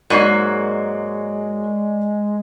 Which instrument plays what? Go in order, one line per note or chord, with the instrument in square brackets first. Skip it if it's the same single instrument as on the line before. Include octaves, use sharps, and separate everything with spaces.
[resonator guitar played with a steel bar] G#2 F#3 A#3 [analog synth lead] G#3 [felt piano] D5 C#6 C7